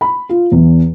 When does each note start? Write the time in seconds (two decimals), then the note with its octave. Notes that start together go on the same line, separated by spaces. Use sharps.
0.01 B5
0.29 F4
0.52 E2